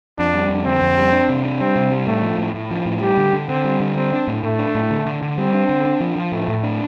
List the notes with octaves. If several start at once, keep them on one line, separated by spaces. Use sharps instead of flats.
F2 D4
G3
F2
D3 C4
F2
G3
D4
C3
D4
G3 C4
C3
G3
A2 A3
F3
A2
A2
F3
A2
G3 G4
D3
D3
D3 C4
G3
D3
G3 C4
D4
A2
A2 A3
D4
A2
D3
D3
D3
G3 C4
D4
D3
D4
F3
F3
A2 A3
A2
D4